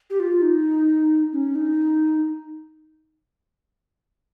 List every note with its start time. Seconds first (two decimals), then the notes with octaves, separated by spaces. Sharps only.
0.10 G4
0.20 F4
0.42 D#4
1.33 C#4
1.55 D#4